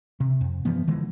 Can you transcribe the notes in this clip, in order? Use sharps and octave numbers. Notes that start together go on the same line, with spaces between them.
C3
F2
G2 E3 F3 B3
D3 E3 F3 G#3